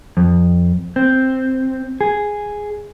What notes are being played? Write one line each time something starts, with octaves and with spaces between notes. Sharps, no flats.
F2
C4
G#4